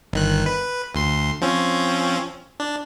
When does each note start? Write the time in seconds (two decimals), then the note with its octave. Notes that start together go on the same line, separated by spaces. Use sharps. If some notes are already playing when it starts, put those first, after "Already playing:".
0.13 G1 D#3 F#6
0.46 B4
0.95 D2 C6
1.41 F3 C4 C#4
2.60 D4